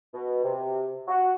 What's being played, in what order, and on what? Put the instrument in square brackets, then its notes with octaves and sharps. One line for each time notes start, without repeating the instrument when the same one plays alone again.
[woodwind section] B2
C3
F#4